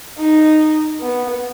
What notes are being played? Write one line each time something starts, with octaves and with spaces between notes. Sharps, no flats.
D#4
B3